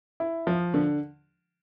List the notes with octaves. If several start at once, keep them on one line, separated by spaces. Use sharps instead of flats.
E4
F3
D3